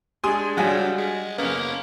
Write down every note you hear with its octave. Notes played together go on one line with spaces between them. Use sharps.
G#3 D4 G4 G#5 C6 D#6
C#3 F#3 G3 F4 F#5 G#5 G6
G#3
F#1 A#3 B3 C#4